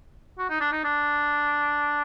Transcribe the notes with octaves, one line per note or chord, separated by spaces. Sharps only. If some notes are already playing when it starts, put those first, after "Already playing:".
F#4
D#4
D4
D#4
D4